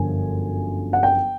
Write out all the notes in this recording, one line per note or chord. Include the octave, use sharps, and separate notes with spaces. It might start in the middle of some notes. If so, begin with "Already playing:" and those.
Already playing: G1 F#2 D3 F3 G#5
F#5
G5